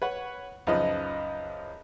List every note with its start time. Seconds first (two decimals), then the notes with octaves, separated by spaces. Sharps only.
0.02 B4 C#5 F#5
0.67 C#2 F#2 F3 D#4 B4 D#5